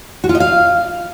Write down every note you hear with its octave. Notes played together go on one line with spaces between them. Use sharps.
F#4
F4
D#5
F5